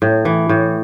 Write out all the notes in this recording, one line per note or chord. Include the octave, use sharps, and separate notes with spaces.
A2
E3
A2